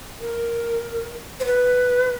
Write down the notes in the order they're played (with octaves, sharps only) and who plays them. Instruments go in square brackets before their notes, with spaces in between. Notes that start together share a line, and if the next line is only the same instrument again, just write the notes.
[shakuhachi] A#4
C5
B4